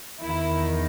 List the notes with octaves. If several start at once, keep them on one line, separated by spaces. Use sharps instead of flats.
E2 D#3 E4